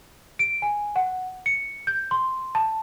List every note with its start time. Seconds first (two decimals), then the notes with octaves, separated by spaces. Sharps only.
0.39 D7
0.62 G#5
0.96 F#5
1.46 C#7
1.87 G6
2.11 C6
2.55 A5